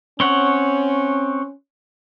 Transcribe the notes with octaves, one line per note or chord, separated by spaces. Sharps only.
C4 C#4 C#5 F#5